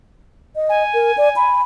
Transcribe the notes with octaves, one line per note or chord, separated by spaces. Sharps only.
D#5
G#5
A#4
D5
B5